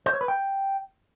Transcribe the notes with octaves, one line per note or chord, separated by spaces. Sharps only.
C5
C#5
B4
G5